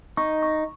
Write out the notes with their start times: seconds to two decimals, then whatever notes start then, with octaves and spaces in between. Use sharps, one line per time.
0.17 D#4 C#6
0.43 C#6